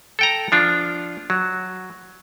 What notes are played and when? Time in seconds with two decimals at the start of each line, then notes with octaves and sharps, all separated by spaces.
0.19 A4 G5 A#5
0.52 F3 D4 F4
1.30 F#3